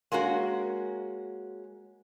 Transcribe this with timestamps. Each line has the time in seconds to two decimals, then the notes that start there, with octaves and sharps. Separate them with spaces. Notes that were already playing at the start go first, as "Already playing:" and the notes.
0.12 G#3 A#3 C#4 F#4